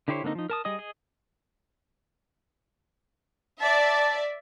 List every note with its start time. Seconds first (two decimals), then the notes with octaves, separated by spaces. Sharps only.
0.08 D3 E4 G4 C5 C#5
0.23 D3 A#3 C4 D4 D#4
0.35 F3 D#4
0.50 A#4 A5 D#6
0.65 G3 G#4 D#5 D#6
0.79 G#4 D#5
3.61 D5 E5 A5